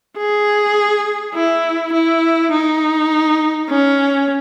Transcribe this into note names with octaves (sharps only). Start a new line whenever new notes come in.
G#4
E4
E4
D#4
C#4